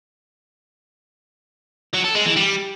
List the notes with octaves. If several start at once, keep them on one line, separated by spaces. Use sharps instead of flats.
F#3
A4
G#3
E3
G3